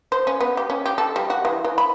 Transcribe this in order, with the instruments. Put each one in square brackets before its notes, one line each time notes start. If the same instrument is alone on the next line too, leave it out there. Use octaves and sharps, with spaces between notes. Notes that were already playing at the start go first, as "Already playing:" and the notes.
[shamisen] C5
C#4
B3
G4
C#4
G4
A4
G3
F#4
E3
E3
B5